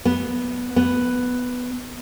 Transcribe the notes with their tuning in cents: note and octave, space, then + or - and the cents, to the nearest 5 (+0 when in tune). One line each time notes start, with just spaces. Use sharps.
B3 -5
B3 +5